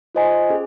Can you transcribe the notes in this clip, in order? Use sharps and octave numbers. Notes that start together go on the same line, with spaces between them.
F4 C5 D#5 G#5
C#4 G#4